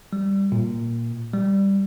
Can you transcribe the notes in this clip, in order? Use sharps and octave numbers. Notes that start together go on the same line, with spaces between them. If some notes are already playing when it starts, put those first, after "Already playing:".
G3
A#2
G3